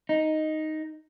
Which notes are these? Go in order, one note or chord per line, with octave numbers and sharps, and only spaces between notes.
D#4